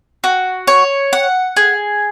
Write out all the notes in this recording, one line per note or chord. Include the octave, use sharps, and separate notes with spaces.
F#4
C#5
F#5
G#4